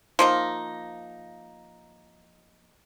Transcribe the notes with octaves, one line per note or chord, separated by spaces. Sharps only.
F3 A#3 D#4